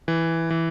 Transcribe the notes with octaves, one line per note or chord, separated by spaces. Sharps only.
E3
E3